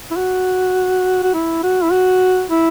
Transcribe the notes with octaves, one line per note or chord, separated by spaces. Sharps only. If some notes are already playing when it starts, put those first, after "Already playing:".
E4
F#4
F#4
E4
F#4
E4
F#4
E4